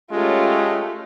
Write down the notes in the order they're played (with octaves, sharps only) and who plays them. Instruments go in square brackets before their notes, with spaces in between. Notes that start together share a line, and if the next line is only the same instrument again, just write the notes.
[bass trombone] G#3 [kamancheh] A3 F4 [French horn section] C#4 G4